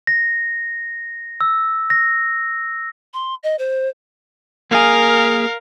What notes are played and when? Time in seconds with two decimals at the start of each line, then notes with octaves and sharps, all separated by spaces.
0.07 A#6
1.41 E6
1.90 A#6
3.14 C6
3.43 D#5
3.59 C5
4.71 A#3 G#4 A#4 F5